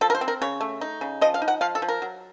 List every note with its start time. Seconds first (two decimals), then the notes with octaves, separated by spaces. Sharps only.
0.01 F3 A4
0.10 A#4
0.15 C5
0.21 C4
0.28 A#4
0.42 C#3 C#5
0.61 A3
0.81 D#4
1.01 C#3
1.21 F3 D#5
1.34 F5
1.42 D#4
1.48 F#5
1.61 F3 F5
1.75 A4
1.82 F3
1.88 A#4
2.02 F#3